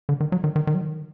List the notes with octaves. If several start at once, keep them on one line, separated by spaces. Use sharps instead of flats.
D3
D#3
F#3
D#3
D#3
D#3
F#3
D#3